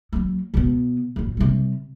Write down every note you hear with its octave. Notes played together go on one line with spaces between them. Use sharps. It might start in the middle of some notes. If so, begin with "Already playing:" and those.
F#3 A#3
B2 B3
F#2 A#2
C3 G3